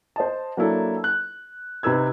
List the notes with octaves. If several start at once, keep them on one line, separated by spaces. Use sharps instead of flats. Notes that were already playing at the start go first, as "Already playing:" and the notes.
C5 D#5 A5
F#3 A#3 D4 E4 A4
F#6
C3 D#4 B4 E6 G#6